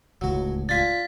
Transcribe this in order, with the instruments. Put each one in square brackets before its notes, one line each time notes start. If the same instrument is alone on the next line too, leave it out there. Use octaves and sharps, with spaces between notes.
[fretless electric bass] D1 C#2 A2 [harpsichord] F#3 F#4
[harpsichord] D4 F4 G#5 [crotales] A6 B6